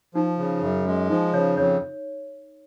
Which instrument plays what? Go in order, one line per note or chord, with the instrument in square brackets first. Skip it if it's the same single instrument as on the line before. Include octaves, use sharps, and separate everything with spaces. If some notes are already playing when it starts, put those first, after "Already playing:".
[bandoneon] F3 [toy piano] D#4
[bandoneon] C#3
F#2
G#3
[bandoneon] F3 [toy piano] D#4
[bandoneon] C#3 [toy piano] C#5
[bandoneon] F2 [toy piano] C#5